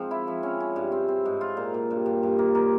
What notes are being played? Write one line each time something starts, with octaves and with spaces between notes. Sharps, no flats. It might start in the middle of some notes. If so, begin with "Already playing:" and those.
Already playing: G#2 F3 C4
E4
F3
C#4
C#4
G2
C4
C4
G#2
F4
A#2
A#2
G2
G2
G2
A#3
A#3